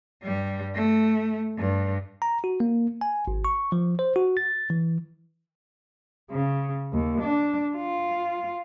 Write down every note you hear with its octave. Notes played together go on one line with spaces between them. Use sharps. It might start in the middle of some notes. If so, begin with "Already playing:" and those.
G2 G3
A3
G2
A#5
F#4
A#3
G#5
G#1
C#6
F3
C5
F#4
A6
E3
C#3
D#2
D4
F4